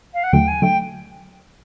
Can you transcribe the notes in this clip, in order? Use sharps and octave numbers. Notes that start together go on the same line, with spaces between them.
F5
F#5
D#2 D3 F#3 A3 G5
G#5
D3 F#3 A3 G5